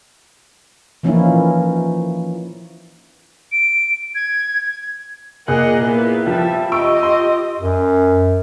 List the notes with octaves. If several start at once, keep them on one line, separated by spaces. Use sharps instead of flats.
E3 F3 A#3 C#4 D#4 E4
D7
G#6
A#2 G#4 A#4 D#5 F#5 F#6
A#3 B3 E4
F3 G3 E5
F4 G4 D#5 C#6 E6 D7
C6
F#2